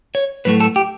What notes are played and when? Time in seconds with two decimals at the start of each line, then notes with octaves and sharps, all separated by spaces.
0.15 C#5
0.45 A2 F#3 A3 B4
0.60 A4
0.76 G4